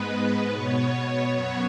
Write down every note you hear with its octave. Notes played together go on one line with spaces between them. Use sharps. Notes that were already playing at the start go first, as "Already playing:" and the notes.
Already playing: G#2 G#3 B3 B4
B2 B3 C#5
F#2 F#3 B3 C#5